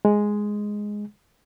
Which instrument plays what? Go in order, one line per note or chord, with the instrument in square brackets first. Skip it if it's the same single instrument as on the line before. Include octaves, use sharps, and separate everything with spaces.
[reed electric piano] G#3